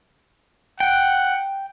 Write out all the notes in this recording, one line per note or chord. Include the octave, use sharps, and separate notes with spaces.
F#5 G5